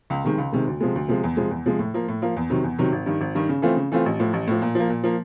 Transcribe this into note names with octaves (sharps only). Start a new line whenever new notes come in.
C#2
C3 D#3 G#3
C#2
C3 D#3 G#3
D2
C3 F3 G#3
D2
C3 F3 G#3
E2
C3 F3 G#3
E2
C3 F3 G#3
A2
F3 A#3
A2
F3 A#3
E2
C3 D#3 F#3
E2
C3 D#3 F#3
G#1
G2 D#3
G#1
G2 D#3
C#3
E3 A3 C4 F4
C#3
E3 A3 C4 F4
A1
A2 F3
A1
A2 F3
A#2
F3 A#3
A#2
F3 A#3